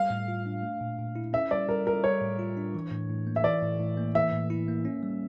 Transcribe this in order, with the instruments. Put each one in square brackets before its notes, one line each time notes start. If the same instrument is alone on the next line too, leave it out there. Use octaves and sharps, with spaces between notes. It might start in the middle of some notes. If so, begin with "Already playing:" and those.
Already playing: [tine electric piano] G3 [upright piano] F5
[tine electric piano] A2
F4
D4
A3
A#2
A#2
E4
[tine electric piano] C#4 [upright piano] E5
[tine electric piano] G3 [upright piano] D5
[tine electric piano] G3 [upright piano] A#4
[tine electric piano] F4 [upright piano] A#4
[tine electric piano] G3 [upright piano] C#5
[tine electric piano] A2
F4
D4
E3
A2
A2
A#3
[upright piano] E5
[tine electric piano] E3 [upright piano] D5
[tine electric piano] A2
A2
A#3
[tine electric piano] E3 [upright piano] E5
[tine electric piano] A2
E4
A#3
C#4
G3